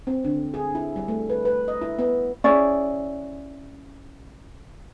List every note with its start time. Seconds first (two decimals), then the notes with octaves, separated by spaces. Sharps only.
0.07 C4
0.24 D3
0.54 G#4
0.75 E4
0.96 G3
1.08 A3
1.30 B4
1.45 B4
1.68 D#5
1.81 E4
1.99 B3
2.44 C#4 E4 G#4 D5